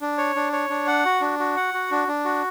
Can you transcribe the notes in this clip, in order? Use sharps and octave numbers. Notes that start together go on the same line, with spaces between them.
D4
C#5
D4
C#5
D4
F#5
F#4
D4
F#4
F#5
F#4
D4
D4
F#4